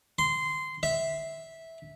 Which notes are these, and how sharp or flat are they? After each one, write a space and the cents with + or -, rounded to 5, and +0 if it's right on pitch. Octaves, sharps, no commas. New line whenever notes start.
C6 -15
E5 -10